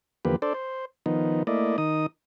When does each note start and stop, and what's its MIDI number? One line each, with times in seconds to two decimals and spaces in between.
0.25 0.36 40
0.25 0.36 50
0.25 0.36 53
0.25 0.36 58
0.25 0.36 67
0.25 0.36 71
0.42 0.53 62
0.42 0.53 69
0.42 0.53 72
0.42 0.53 74
0.54 0.85 72
1.06 1.43 51
1.06 1.43 53
1.06 1.43 59
1.06 1.43 63
1.47 1.77 57
1.47 1.77 58
1.47 1.77 64
1.47 1.77 74
1.47 1.77 75
1.78 2.06 51
1.78 2.06 63
1.78 2.06 87